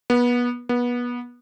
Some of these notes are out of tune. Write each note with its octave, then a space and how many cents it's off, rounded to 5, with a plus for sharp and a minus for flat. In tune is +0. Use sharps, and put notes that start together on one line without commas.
B3 -25
B3 -25